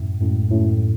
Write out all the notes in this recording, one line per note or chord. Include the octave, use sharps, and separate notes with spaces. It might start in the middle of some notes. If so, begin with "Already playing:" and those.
Already playing: F#2 A2
F#2 A2
F#2 A2